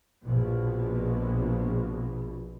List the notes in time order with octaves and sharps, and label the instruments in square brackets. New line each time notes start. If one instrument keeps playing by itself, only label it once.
[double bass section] A#1 B2